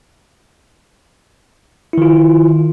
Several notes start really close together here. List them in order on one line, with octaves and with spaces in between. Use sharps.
E4 D#3 F4